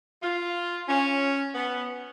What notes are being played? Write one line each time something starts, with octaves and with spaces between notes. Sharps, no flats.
F4
C#4
B3